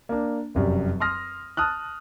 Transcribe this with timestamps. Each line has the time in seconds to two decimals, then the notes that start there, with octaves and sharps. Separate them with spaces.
0.09 A#3 D4
0.55 F1 F#2 G3
1.00 C6 D#6 F6 A#6
1.57 A5 D#6 F6 F#6